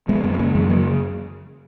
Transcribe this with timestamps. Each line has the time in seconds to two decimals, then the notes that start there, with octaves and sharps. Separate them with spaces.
0.08 B2 G#3 B3
0.24 F#2 G#3 B3
0.34 B3
0.39 C#3 A#3 C#4
0.55 F#2 E3 G#3
0.69 C#3 F#3 A#3